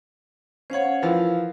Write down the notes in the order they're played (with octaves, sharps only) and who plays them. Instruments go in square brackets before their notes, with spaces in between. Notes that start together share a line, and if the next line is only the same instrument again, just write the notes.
[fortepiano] C#4 C#5 [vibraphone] C5 F5 F#5
[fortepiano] E3 F3 [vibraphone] A#4 F5